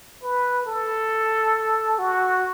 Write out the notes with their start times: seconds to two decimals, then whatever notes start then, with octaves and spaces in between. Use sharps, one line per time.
0.23 B4
0.66 A4
1.98 F#4